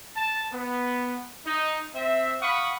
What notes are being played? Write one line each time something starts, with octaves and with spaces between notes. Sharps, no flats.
A5
B3
D#4
C4 E5
F5 F#5 B5 C#6 D#6